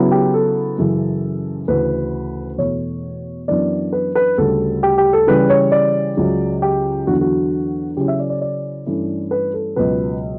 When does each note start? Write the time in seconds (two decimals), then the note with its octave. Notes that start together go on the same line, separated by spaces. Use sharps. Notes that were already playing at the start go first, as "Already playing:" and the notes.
Already playing: C#3 F#3 B3 E4
0.11 G4
0.34 A4
0.78 F#2 C#3 E3
1.68 D2 C#3 E3 B4
2.58 E2 B2 A3 C#5
3.48 F#2 E3 B3 D4 D5
3.93 B4
4.15 B4
4.38 D2 C#3 G3 A4
4.83 G4
4.98 G4
5.13 A4
5.27 C#3 E3 G3 C#4 B4
5.50 C#5
5.72 D5
6.17 C#2 C#3 F#3
6.62 G4
7.07 E2 D3 F#3 F#4
7.21 F#4
7.97 C#3 F#3 C#4 E4 G4
8.08 E5
8.19 D5
8.30 D5
8.41 D5
8.86 G2 E3 A3 C#4 E4
9.31 B4
9.54 A4
9.76 C#2 B2 F#3 B4